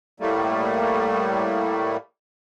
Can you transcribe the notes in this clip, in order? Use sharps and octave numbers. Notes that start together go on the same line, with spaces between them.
A2 G3 A3 A#3